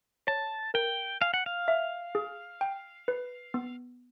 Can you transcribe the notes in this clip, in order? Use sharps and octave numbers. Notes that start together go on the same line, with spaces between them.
C#5 A5
A#4 G5
F5 G#5
F#5
F5
E5
G#4
G5
B4
B3